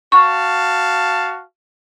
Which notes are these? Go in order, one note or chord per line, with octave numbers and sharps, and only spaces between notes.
F#4 F5 A5 C#6